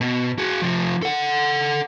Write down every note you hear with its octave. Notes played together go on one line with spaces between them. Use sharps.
B2
F#4 G#4
C3 F3
A4 F#5